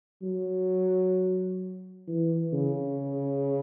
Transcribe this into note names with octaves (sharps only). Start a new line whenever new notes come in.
F#3
E3
C#3